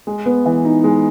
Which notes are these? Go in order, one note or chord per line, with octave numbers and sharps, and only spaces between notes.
G#3
B3
E3
D#4
G#3